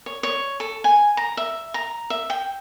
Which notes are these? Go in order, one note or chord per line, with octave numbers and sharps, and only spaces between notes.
C#5
C#5
A4
G#5
A#5
E5
A#5
E5
G5